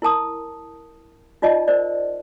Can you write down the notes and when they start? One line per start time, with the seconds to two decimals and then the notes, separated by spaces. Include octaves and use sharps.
0.02 E4 A#4 A5 D#6
1.42 D#4 F4 D5 D#5 A5
1.68 A#4 C5 D5